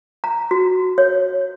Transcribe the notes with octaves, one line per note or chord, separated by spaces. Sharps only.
A#5
F#4
C#5